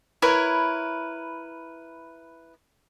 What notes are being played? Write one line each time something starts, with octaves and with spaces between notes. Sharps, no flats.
E4 A#4 B4 C#5